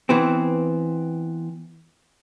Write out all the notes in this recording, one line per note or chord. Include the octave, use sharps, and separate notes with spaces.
E3 B3 C4